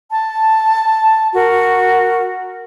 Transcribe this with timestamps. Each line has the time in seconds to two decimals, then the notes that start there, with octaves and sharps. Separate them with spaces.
0.11 A5
1.34 F#4 A#4